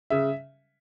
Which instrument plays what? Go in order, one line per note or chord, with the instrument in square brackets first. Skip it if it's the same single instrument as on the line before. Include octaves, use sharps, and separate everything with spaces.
[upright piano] C#3 E5